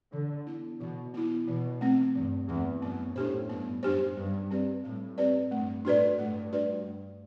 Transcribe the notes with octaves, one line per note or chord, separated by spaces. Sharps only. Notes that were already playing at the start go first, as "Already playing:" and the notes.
D3 E3
B3 E4
B2 E3
B3 E4
B2 E3
A3 C4
G2 E3
E2 A3 C4
F#2 B3
A2 D4 G4 C5
G2 B3
F#2 D4 G4 C5
G2 G3
C4 G4 B4 D5
A2 G3
C4 G4 B4 D5
G2 A3
A2 D4 F#4 B4 D5
G2 A3
D4 F#4 B4 D5
A3